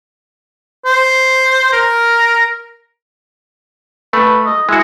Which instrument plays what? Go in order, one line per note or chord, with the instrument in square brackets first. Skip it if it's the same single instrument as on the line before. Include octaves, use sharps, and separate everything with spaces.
[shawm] C5
A#4
[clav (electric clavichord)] A3 [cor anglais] B4
[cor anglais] D#5
[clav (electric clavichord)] G#3 F#4 [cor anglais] E4